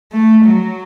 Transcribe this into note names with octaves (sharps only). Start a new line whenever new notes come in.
A3
F#3